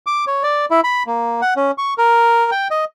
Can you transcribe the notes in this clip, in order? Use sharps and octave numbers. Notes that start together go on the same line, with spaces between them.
D6
C#5
D5
E4
B5
A#3
F#5
C#4
C#6
A#4
G5
D#5